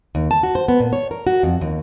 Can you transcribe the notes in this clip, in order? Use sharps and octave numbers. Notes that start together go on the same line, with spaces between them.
D#2
A5
F#4
C5
B3
A#2
C#5
A#4
F#4
F2
D#2